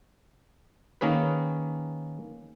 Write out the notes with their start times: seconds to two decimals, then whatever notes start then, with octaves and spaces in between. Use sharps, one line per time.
1.01 D#3 A#3 C#4 G#4 B4